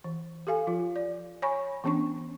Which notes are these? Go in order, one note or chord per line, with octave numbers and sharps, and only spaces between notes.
E3
G4 A4 F5 G#5
F3 F4
D5
C#5 G#5 B5 C#6
E3 B3 C#4 D4 C#6